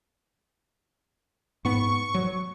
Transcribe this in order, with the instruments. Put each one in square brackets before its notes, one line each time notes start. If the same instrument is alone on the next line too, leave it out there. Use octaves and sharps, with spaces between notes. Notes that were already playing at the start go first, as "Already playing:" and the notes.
[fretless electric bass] G#2 B3 [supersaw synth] C#6
[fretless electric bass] F#3